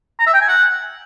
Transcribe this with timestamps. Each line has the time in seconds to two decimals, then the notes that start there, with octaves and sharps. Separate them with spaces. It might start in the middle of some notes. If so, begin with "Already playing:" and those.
0.19 A#5
0.26 E5
0.34 G5
0.41 G#5
0.48 F#5